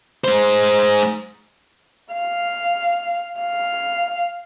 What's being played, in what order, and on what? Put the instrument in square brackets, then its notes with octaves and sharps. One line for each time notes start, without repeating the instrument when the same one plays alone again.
[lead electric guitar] G#3 C5
[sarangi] F5
F5